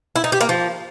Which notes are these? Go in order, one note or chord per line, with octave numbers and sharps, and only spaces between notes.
E4
D#4
G4
A#3
F3